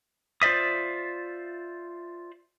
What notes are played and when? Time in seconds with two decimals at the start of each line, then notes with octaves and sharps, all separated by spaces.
0.42 F4 C5 D5 E5 D#6